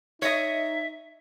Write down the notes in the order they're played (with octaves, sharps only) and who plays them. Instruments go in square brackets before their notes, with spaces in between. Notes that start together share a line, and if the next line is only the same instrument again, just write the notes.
[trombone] D#4 [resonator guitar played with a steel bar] C#5 D#5 [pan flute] E5